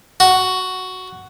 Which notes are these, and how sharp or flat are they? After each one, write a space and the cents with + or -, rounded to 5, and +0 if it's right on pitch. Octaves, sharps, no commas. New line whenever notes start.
F#4 +5